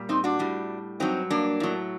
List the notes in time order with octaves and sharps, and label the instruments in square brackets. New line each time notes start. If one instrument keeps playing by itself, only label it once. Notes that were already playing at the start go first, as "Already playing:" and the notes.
Already playing: [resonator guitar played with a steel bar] A#2 G3
C4 D#4
D4 F#4
A2 G3
G2 F#3 C4 D#4
A#3 D4
A2 F#3